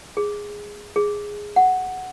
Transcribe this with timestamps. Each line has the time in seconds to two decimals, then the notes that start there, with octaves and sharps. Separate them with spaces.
0.17 G#4
0.96 G#4
1.56 F#5